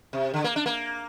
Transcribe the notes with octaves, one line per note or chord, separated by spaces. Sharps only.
C3
D3
A#3
D4
A#3